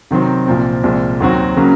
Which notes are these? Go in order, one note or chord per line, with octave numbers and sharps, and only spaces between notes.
C3 D#3 F#3 C4
C2 A#2 F3 C4
C2 A#2 F3 G#3
D#2 D#3 F#3 C4 F#4
C#3 F#3 A#3 C#4